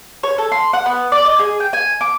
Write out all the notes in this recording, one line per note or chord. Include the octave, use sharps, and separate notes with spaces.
C#5
A4
C6
F#5
B3
D5
D#5
G#4
G5
G#5
D6